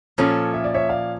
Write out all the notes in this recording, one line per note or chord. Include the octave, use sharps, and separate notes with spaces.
A#2 F3 C#4 A4 C#5
E5
D5
C#5 E5
D5 F5